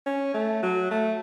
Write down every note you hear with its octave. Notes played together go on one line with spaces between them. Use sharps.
C#4
A3
F#3
A3